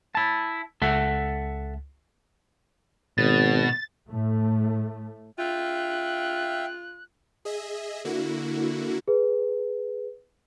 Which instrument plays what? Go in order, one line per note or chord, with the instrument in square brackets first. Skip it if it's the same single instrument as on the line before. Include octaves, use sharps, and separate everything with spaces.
[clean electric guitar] E4 A5
[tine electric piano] C#2 [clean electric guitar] A4 E5 F#5
[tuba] G#1 [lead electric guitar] B2 [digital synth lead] A6
[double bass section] A2 A3
[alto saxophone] F4 [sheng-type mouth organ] E5 F5 G5 [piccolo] F#6
[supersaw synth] G#4 D#5 E5
D3 A#3 E4 F#4
[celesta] G#4 B4